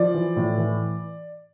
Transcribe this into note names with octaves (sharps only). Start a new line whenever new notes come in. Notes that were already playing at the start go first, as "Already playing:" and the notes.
Already playing: F3 D5
E3
A2
E3